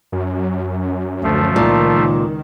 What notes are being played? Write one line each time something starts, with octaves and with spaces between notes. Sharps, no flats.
F#2
D2 F3 A3
C#2 A#2 D#3